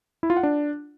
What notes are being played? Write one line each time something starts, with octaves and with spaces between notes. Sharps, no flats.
E4
F4
F#5
D4